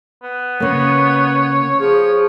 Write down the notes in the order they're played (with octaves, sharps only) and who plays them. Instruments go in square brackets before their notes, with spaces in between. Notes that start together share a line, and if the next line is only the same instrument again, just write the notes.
[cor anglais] B3
[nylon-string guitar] C#3 A#3 [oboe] C#5
[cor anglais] F3 [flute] G#4 [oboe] C#5